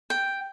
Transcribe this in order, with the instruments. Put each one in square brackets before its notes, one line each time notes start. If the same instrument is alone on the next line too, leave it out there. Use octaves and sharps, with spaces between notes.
[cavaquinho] G5